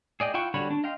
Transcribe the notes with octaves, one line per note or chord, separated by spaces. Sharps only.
G#4 D5 D#5 G5
E4 F4 F#5 G5 C#6
D3 G3 F#4 C#5 B5
D4
D#5 F5 G5 C6